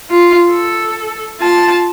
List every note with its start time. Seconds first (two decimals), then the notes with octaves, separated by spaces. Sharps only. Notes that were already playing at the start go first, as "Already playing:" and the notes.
0.10 F4
0.51 A4
1.40 F4 A5